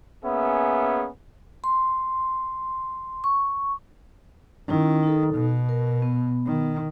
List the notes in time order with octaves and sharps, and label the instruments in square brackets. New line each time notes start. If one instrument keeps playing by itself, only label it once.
[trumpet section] A#3 B3 C#4 G#4 E5
[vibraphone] C6
C#6
[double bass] D#3 [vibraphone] C#4 E4
[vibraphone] D#4 A4
[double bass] B2
[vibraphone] A#4
B3
[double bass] D#3